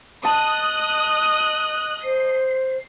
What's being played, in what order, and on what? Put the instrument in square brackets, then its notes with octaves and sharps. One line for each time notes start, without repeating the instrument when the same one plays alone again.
[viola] D#5 [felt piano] A5 [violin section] D#6 F#6
[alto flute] C5 [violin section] C7